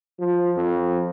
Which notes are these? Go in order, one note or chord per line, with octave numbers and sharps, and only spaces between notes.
F3
F2